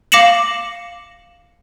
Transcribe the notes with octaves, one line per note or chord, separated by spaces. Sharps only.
F5 D6 A#6 C#7 E7 F#7